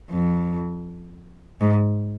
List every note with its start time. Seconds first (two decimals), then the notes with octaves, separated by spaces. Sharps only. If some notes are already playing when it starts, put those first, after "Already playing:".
0.11 F2
1.61 G#2